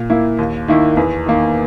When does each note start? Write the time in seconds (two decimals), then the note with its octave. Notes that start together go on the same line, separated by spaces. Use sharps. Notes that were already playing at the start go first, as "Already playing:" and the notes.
Already playing: A#2
0.10 A#3 E4
0.39 D#2
0.68 D#3 A#3 E4
0.97 E2
1.26 D#3 A#3